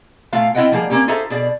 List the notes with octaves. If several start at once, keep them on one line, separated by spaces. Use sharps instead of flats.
A#2 A3 F4 F5
C4 E4 F4 D#5 F#5 G5
F3 G3 A#3 G#4
A#3 C4 C#4 G4
F4 G#4 A4 C5 E5 A#5
B2 G#4 D5